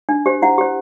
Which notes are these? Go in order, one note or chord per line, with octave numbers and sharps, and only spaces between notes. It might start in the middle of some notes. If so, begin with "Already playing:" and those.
D4
G4 C5
E4 F#5
G4 C5